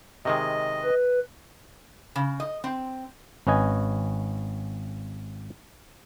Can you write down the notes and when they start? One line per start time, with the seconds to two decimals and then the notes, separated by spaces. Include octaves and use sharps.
0.25 C3 D#3 G#3 D#5
0.84 B4
2.16 C#3
2.40 D#5
2.64 C4
3.47 G#1 C#4 B4 D#5 G#5